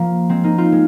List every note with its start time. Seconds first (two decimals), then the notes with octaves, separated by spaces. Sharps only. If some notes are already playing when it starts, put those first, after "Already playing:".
Already playing: F3 A#3
0.29 G#3 C4
0.44 A#3 D#4
0.58 C4 F4
0.72 G#3